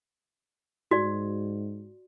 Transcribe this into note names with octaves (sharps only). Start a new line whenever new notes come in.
G#2 F#4 D5